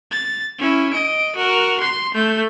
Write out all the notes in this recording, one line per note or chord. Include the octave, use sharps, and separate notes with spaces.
A6
C#4 E4
D#5 D7
F#4 A#4
C6 C7
A3 G6